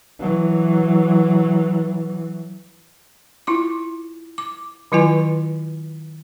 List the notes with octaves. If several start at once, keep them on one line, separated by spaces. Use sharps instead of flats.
E3 F#3
E4 F4 D6
D6
D#3 F#3 E4 F4 B4 G#5